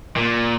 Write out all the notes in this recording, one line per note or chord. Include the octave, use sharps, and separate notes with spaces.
A#2